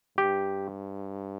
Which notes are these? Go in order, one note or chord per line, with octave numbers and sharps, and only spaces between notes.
G2 G4